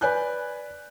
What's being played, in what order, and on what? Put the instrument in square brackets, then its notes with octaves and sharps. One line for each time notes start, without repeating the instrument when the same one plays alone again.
[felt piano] B4 D5 G#5 F#6 G6